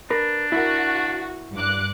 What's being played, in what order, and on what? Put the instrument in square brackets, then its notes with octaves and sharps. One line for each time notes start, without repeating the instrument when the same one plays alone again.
[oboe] D4 [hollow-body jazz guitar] A#4 B4
[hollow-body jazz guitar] E4 A#4 [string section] F#4
[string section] G2 D6 F#6